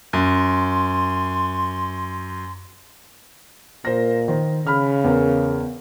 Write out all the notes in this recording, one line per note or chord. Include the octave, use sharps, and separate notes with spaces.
F#2 C6
A#2 A#4 C5 A#6
D#3 C5
C#3 B5 F6
E2 A#4